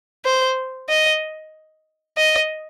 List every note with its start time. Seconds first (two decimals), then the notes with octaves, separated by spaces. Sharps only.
0.25 C5
0.89 D#5
2.17 D#5